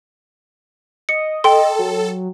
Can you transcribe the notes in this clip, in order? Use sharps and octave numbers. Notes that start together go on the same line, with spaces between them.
D#5 C#7
A4 G5 C6
F#3